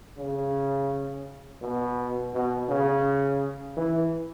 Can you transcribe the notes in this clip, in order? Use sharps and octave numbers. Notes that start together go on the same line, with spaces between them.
C#3
B2
B2
C#3
E3